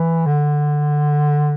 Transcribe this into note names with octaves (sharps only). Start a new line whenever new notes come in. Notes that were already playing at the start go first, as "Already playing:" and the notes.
Already playing: E3
D3